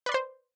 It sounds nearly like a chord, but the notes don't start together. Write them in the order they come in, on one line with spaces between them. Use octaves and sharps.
B4 D5 C6 C5